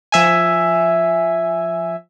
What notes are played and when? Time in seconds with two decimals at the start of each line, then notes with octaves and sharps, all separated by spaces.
0.12 F3 E5 G#5